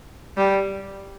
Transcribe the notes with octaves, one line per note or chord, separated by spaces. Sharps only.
G3